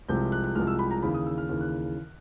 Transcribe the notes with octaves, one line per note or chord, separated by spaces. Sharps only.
C2 C3 F3 G#3 G6
F#6
F#6
C2 C3 F3 G#3 F6
E6
B5
A#5
D#2 C#3 E3 B5
D#6
E6
F6
D#2 C#3 E3 F6
F#6